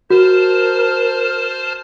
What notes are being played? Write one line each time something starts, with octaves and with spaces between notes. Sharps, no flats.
F#4 A#4 C5 A5 F6